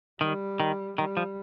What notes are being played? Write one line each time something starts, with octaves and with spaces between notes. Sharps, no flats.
D#3 G3
D#3
D#3 G3
F3